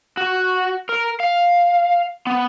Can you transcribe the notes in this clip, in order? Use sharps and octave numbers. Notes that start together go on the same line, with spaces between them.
F#4
A#4
F5
B3